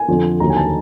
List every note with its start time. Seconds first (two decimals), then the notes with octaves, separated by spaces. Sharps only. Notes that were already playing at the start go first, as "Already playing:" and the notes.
Already playing: G#5
0.08 F2 D3 F3
0.40 D#2 D3 F#3 A#5
0.50 G#5
0.57 A5